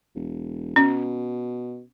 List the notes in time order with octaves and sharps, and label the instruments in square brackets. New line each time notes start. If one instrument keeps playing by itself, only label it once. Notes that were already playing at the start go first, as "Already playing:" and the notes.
[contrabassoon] E1
[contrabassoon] B2 [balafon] C#4